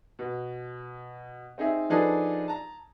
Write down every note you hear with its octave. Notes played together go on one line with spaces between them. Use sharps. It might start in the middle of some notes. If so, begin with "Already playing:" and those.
B2
C4 D#4 G#4 E5
F3 D4 D#4 G#4 A4 B4
A5 A#5